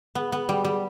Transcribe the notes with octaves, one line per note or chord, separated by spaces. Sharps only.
B3
B3
G3
G3